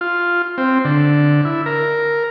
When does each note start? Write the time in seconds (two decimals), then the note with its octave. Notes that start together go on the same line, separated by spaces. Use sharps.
0.01 F4
0.58 C4
0.85 D3
1.45 E4
1.66 A#4